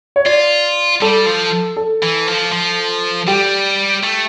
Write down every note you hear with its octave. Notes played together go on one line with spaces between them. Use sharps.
C#5
F4 D5
G3 A4
F3
A4
E3
F3
F3
G3 G4
A3